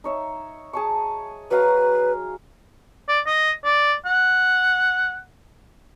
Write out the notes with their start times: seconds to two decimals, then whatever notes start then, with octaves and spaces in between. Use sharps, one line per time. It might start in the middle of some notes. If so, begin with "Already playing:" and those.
0.04 D#4 C#5 E5
0.73 G#4 A5 C#6
1.51 F#3 B4 F5 A#5
3.08 D5
3.26 D#5
3.64 D5
4.05 F#5